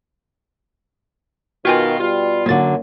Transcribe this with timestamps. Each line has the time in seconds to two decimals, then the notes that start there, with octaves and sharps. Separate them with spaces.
1.65 B2 D#3 F4 F#4 G5 G#5
1.99 B2 G3 F4
2.46 F#2 D3 F#3 A#3 A6